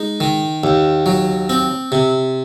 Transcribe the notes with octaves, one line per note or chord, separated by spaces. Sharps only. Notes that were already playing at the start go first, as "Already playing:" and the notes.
Already playing: G#3 D#4
D#3
D#2
F#3
C4
C3